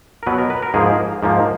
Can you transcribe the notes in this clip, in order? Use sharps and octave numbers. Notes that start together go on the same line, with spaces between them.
A#4
B2 F#3 B3 B4
A#4
B4
A#4
G#2 F3 A#3 G#4
G#2 F3 A#3